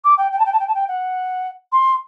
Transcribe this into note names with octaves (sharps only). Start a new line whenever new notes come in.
D6
G5
G5
A5
G5
A5
G5
A5
G5
F#5
C6